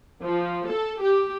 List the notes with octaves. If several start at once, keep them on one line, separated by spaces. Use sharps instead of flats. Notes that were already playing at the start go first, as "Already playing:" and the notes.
F3
A4
G4